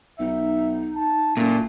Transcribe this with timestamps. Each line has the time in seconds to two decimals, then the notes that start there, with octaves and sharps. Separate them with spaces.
0.19 B1 D#4 E5
0.97 A5
1.37 F#1 A#2 A3